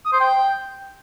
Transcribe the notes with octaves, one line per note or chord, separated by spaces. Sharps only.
D#6
C5
G5